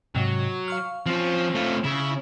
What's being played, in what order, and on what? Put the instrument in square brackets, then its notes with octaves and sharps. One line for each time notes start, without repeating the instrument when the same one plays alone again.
[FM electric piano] G#2 C3 [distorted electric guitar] F#3
[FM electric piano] F5 C#6 F6
[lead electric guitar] F3 F4 [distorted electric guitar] C4 C#4
[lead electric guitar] A3 F4
[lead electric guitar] C#3 [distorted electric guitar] E4